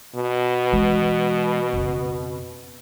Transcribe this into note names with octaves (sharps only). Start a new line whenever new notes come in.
B2
E3 G#3
F2 C#3